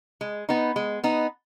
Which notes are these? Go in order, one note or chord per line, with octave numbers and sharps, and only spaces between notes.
G#3
B3 D#4
G#3
B3 D#4